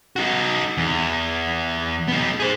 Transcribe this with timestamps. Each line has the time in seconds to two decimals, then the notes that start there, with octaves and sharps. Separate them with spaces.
0.16 D#4 F#4
0.78 E2
2.08 B3 D#4
2.40 G#4 C5